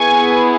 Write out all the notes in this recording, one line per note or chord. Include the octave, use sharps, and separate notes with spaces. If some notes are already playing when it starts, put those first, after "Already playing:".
Already playing: B3 E4 G#4 G#5 C#6